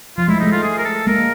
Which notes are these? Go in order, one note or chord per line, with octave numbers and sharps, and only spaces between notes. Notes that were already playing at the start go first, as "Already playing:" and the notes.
F3 F4
G#3 A3 E4
A3 D#4
G#3 F4
G#4
A#4
A4
G#3 A#3 A#4